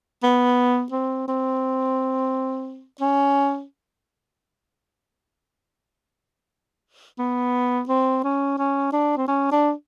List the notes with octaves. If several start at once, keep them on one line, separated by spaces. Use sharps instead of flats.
B3
C4
C4
C#4
B3
C4
C#4
C#4
D4
C4
C#4
D4